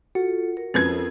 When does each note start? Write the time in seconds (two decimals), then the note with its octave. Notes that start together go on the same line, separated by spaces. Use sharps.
0.15 F4 F#4 A4
0.57 A#4
0.74 F2 C#4 F4 B4 G#6